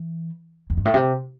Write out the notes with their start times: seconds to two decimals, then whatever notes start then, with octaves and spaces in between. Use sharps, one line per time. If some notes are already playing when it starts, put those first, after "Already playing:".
Already playing: E3
0.70 E2
0.77 G2
0.85 A2
0.94 C3